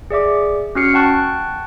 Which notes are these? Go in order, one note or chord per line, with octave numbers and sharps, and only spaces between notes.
G#4 D5 E5 D6
C#4 F#4 F6 C7 C#7
F#5 G5 A5 C#6 F#6